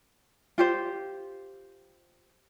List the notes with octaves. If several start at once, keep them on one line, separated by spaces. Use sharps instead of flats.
F4 G4 C5